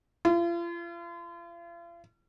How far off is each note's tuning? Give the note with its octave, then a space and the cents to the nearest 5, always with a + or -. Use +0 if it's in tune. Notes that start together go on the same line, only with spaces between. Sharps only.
F4 -40